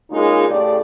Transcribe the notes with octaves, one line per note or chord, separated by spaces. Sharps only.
C#3 G#3 A#3 C#4 D#4 F4
A2 C#3 A3 G4 D5